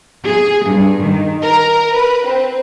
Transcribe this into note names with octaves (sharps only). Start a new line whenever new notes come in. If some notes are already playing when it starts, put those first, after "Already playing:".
G#4
G2
D#3
A#4
B4
C4